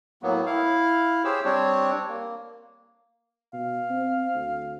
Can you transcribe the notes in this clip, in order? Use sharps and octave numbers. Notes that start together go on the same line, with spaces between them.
A2 F#3 A#3 B3
E4 F5
G4 G#4 C5 C#5 E6
G3 C4 D4 C#5
A#3
B2 F5
C4
D2